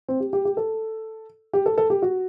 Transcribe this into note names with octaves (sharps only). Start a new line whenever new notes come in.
C4
G4
G4
G4
A4
G4
A4
A4
G4
F#4